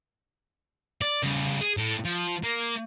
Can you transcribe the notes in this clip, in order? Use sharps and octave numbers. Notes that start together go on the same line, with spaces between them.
D5
C#3 G3
G#4
A2
F3
A#3